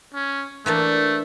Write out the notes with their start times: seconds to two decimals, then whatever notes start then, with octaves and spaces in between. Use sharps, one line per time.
0.14 C#4
0.66 E3 A3 A#3 D4